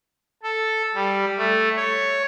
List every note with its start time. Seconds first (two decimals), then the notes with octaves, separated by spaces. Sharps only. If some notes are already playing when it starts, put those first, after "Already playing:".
0.43 A4
0.95 G3
1.37 A3
1.76 C#5